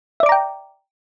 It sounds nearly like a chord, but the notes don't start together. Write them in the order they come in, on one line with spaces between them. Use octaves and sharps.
E5 D5 D6 A#5 G5